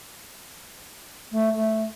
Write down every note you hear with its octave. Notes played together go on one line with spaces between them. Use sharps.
A3
A3